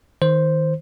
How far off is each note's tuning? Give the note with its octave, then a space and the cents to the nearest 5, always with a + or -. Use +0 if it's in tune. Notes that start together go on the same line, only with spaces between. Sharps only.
D#3 +15 C5 +0